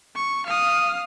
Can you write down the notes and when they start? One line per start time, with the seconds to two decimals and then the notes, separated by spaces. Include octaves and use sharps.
0.15 C#6
0.46 F5 D#6